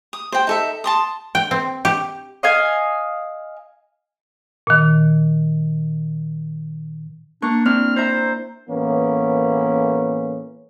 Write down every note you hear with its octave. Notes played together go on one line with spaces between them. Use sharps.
D#6
C5 G5
D#4 A4 E5
A5 C6 D#6
G5
C4
G4
D#5 F5 G#5
A#2 D#3
A#3 D4 C#6
C4 D4 E4 F6
E4 C5 E5 A#5
A2 E3 A#3 B3 C#4